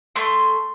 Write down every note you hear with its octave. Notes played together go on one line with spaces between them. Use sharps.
A3 C6